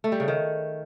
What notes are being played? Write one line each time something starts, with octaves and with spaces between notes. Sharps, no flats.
A3
G3
C#3
D#3